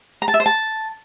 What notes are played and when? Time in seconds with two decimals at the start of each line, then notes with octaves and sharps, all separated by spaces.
0.22 A#5
0.28 A5
0.34 E5
0.40 C5
0.46 A5